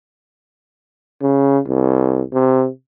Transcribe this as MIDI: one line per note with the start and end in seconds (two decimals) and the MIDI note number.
1.22 1.59 49
1.67 2.22 36
2.33 2.67 48